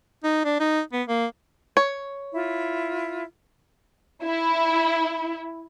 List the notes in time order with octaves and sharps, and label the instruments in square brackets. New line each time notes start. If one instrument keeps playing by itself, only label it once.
[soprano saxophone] D#4
D4
D#4
B3
A#3
[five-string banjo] C#5
[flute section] E4 F4
[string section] E4